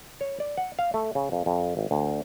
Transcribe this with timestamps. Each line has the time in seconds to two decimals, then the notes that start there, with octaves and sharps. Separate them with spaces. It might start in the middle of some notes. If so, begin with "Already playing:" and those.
0.21 C#5
0.40 D5
0.57 F#5
0.79 F5
0.94 A3
1.15 C#3
1.32 F2
1.46 F2
1.77 G#1
1.91 D2